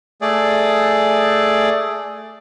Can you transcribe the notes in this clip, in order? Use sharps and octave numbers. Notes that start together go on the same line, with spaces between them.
A3 G#4 D5